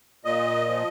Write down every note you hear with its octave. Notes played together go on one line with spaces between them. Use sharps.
A#2 D#5
F3